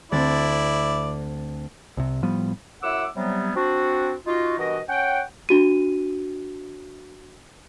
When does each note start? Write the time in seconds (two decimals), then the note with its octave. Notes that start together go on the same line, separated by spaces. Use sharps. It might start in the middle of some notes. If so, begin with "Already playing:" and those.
0.12 D2 C4 E4 D5 A6
1.97 C2 C3
2.23 A2 F3 G3 B3
2.83 F#2 E4 F#5 D6 E6
3.16 C3 F#3 G3 B3
3.55 C4 D4 F#4
4.26 D#4 F4 F#4
4.58 G2 B2 E3 F#4 A#4 D#5
4.89 C#4 F#5 G5
5.49 D4 F#4 D#7